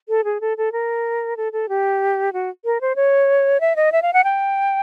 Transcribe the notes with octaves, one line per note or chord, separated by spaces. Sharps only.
A4
G#4
A4
A4
A#4
A4
A4
G4
F#4
A#4
C5
C#5
E5
D#5
E5
F5
F#5
G5